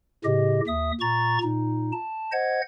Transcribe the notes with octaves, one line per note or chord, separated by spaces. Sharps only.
A2 C#3 G4 D#5
D#2 E5 D#6
A#2 A#5 C#6 A6
A#2 D#4
A5
C5 D#5 F#5 G#6